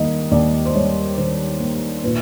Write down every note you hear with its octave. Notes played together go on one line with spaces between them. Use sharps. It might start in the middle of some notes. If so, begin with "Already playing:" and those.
Already playing: D#2 D#3 G3 A#3 D#5
D#2 D5
C5
G3 C#5
D#3 C5
A#3
A#2 B4